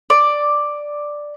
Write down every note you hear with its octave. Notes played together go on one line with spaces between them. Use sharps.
D5